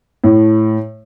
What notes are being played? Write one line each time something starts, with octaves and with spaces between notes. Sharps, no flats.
A2